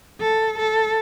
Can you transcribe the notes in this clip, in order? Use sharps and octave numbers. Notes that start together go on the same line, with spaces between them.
A4
A4